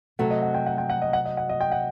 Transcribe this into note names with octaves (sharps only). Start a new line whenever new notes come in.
C3 F#3 A3 C4 F#4 F#5
D#5
F#5
G5
F#5
G5
F#5
D#5
F#5
D#5
F#5
D#5
G5
F#5